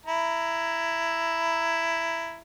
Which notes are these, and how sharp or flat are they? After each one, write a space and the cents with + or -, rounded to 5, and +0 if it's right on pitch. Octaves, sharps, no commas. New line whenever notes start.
E4 +10 A#5 +0